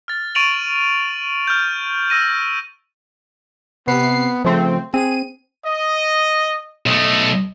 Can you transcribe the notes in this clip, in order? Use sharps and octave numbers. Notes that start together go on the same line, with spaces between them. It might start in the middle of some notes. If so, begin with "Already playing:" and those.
F6 A6
C#6 A6 D7 D#7 F7 F#7
F6 G6
E6 A#6 D#7
C3 B3 C7
C#3 F3 A3 C4
C4 G#4 D#7
D#5
B1 A3 D#5